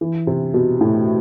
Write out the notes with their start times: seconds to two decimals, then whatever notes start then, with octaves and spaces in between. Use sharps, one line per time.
0.01 E3
0.27 C3
0.54 B2
0.81 A2